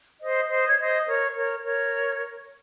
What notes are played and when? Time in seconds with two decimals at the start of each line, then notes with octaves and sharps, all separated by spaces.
0.22 C5 D#5
0.50 C5 D#5
0.67 C#5
0.79 C5 D#5
1.07 A#4 C#5
1.36 A#4 C#5
1.64 A#4 C#5